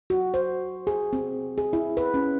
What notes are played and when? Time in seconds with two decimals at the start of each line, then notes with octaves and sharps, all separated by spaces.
0.10 F#4
0.34 C5
0.87 G#4
1.13 C4
1.58 G#4
1.73 E4
1.97 B4
2.14 C#4